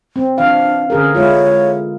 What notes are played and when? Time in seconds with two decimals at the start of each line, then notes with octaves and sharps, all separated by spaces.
0.16 C4
0.38 E3 D4 F5
0.90 D3 C#4 G#4 A#4
1.15 G#3 E4 F4 C#5